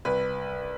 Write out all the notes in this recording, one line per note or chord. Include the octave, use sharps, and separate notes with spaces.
C2 B4